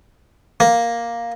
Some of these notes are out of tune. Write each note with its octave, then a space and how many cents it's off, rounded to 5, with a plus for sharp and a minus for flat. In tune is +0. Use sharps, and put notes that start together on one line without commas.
A#3 +5